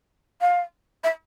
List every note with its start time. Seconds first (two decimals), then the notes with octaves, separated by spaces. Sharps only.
0.41 F5
1.04 E5